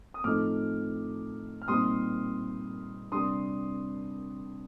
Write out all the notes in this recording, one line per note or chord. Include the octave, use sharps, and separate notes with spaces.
D#6
A2 F3 A3 C4 D#4 D6 F6
F6
A#2 G3 C4 D#4 C6 D#6
C3 G3 D4 C6 D#6